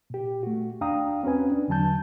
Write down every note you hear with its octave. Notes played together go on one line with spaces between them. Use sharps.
A#2 G4
A3 F#4
D#2 D4 F5 G5 A#5 D#6
C4 C#4 F#4 B4 G#5
D4
E2 D3 F#3 G#5 A5 G6